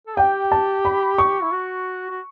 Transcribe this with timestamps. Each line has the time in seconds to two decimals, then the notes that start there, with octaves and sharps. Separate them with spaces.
0.07 A4
0.17 G4 G5
0.52 A5
0.85 B5
1.18 C#6
1.43 E4
1.53 F#4
2.11 F#4